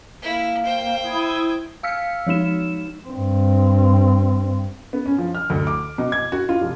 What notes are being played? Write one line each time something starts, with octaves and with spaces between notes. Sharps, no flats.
A#3 E4
C5 G5
E4 D#6 G#6
F5 E6 F6 B6 C#7
F3 G#3 D#4 E7
G2 C4
B3
C#4
F3
F6
D2
D6
B2
G#6
F#4
F4
F1